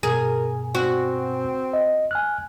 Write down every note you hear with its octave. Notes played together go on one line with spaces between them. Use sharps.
G2 B2 G#4 A#4 G#5
C4 F#4
D#5
G#5 F6 F#6